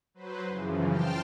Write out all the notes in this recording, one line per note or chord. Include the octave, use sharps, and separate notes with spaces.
F#3 B4 C5
F#2 C#3 E3 F3
G5 A5 C6 F6